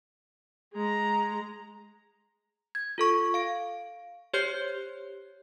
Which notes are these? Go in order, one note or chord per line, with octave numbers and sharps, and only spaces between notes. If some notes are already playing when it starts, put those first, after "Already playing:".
G#3 A#5
G#6
F4 A4 C#6
F5 D7
G4 C5 C#5 G6 C7